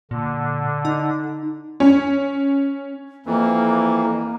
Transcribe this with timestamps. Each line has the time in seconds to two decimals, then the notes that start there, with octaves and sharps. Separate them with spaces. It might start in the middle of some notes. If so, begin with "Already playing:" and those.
0.11 A#2 D3
0.85 D#4
1.80 C#4
3.26 F2 E3 A#3